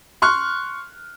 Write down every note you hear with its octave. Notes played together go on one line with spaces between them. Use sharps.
C6 C#6 F6 F#6